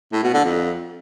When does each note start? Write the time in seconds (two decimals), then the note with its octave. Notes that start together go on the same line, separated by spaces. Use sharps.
0.12 A2
0.23 B2
0.34 D3
0.44 F2